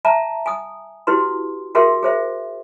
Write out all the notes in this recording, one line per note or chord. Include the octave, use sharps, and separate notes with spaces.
E5 A5 A#5
G#5 D#6
E4 F#4 G4 B4 C6
F#4 G#4 A#4 E5 G5 C6
G#4 C5 E5